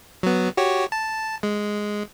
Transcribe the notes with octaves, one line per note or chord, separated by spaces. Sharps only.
F#3 B3
F#4 G4 C#5
A5
G#3